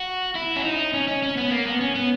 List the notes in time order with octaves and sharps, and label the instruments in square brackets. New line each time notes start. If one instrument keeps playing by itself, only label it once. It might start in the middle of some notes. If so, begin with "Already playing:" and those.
Already playing: [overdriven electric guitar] F#4
E4
C#4
D#4
C#4
C#4
C#4
B3
A#3
B3
C#4
B3